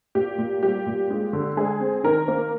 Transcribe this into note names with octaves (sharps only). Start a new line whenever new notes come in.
A#2 G4
A#2
G3 G4
A#2
G#3
D3
G#3 G#4
C4
D#3 A#4
A#3